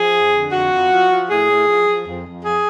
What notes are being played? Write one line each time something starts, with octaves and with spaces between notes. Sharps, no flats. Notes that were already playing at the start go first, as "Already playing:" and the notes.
Already playing: F3 G#4
F2
D3
F2 F#4
F2
F3
F3
A2 G#4
A2
F3
F3
F2
F2
F3 G#4